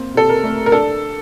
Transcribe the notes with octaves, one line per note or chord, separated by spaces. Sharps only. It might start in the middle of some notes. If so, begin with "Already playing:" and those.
Already playing: A#3 C4
C3 A4
A#4
A3
A#4
D4 A4